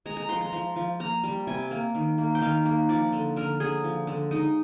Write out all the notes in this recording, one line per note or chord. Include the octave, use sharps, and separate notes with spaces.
G#3 A#5
A#5
F3 C6
A#5
F3 C6
F3
A#3 A#5
G3
C3 G#5
A#3
D#3
A#3
G5
D#3 F5
A#3
F3 D5
D3
D3 A#4
D3 G#4
F3
D3
G#3 D#4